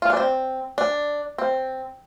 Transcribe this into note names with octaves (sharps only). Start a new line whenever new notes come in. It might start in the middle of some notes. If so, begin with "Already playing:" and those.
F4
D4
C4
D4
C4